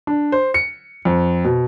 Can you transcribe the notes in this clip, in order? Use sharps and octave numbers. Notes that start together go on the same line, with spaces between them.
D4
C5
C#7
F2
B2